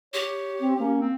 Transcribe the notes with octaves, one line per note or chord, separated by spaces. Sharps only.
G4 C#5
C4
A#3 C#4
C4